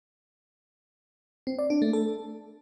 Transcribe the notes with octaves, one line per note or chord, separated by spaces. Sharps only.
C4
D5
D4
A3
A4